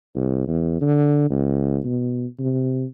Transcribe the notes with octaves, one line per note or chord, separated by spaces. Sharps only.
C2
E2
D3
C#2
B2
C3